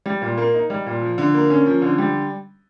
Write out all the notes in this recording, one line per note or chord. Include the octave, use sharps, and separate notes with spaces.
G3
A#2
A#3
D#4
G3
A#2
F3
D3
A#3
C#4
F3
D3
G3